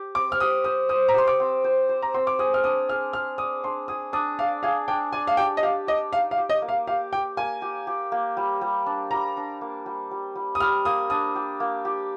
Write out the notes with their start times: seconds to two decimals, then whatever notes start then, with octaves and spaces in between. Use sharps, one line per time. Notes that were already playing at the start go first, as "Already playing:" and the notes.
Already playing: G4
0.15 C4 D6
0.32 F6
0.40 G4 D#6
0.64 C5 D#6
0.89 C5 D#6
1.09 A#5
1.14 G4 C6
1.27 D6
1.40 C4
1.64 C5
1.89 C5
2.02 A#5
2.14 C4 C6
2.27 D6
2.39 G#4 D#6
2.54 F6
2.64 D4 D#6
2.89 G#4 F6
3.13 G#4 F6
3.38 D5 D#6
3.64 D4 C6
3.88 G#4 D#6
4.13 D4 D#6
4.39 D5 F5
4.63 G#4 F5
4.88 D4 G5
5.13 D5 G#5
5.27 F5
5.37 G4 G5
5.57 D#5
5.63 G4 F5
5.87 G4 D#5
6.12 D#4 F5
6.31 F5
6.38 G4
6.49 D#5
6.62 A#3
6.69 F5
6.87 G4 F5
7.12 G4 G5
7.37 A#3 G#5
7.62 G4
7.87 G4
8.12 A#3
8.37 G3
8.61 G3
8.86 D4
9.11 G3 A#5
9.37 D4
9.61 A#3
9.86 G3
10.11 G3
10.35 G3
10.55 D#6
10.60 G3 F6
10.85 A#3 D#6
11.10 D4 D#6
11.35 G4
11.60 A#3
11.85 G4